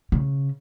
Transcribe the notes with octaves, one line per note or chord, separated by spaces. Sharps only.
C#3